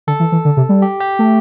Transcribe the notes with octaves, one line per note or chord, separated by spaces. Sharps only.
D3 A4
E3
E3
D3
C3
G3
G4
G4
A3